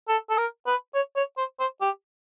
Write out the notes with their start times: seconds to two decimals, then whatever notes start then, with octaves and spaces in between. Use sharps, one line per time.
0.08 A4
0.30 A4
0.38 A#4
0.66 B4
0.94 C#5
1.16 C#5
1.37 C5
1.60 C5
1.81 G4